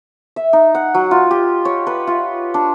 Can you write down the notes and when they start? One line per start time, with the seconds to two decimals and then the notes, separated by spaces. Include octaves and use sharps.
0.36 E5
0.53 D#4
0.75 F#5
0.94 F#3
1.11 F4
1.31 G4
1.65 C#5
1.87 B4
2.07 F4
2.54 D4